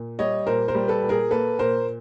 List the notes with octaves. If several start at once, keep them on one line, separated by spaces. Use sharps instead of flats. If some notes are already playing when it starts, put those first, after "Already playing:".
Already playing: A#2
G3 C#5 D#5
A#2 A#4 C5
A#4 C5
G3
A4 B4
A#2
G#4 A#4
A#3 A4 B4
A#2 A#4 C5